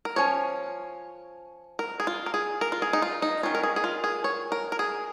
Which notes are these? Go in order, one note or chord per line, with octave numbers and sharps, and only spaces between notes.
A#4
F3 C#4 C#5
A#4
G#4
F4
A#4
G#4
A#4
F4
G#4
D#4
F4
D#4
D#3 C#4 F4
A#4
G#4
G#4
F4
G#4
C#5
A#4
A#4
G#4